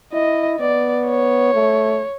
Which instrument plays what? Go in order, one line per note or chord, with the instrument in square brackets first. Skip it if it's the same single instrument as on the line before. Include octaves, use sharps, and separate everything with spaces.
[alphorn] E4 [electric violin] D#5
[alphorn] B3 [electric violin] D5
[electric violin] C#5
[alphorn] A3